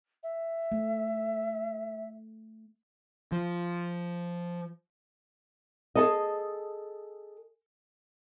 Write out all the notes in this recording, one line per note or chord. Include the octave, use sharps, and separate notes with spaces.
E5
A3
F3
G#4 A4 D#5